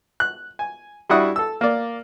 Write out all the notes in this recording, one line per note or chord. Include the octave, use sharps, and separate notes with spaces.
F#6
G#5
G3 D4 E4 F#4 F#5 D#6
A4 E6
A#3 D5